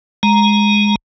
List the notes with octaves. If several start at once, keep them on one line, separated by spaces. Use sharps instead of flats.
G#3 A#5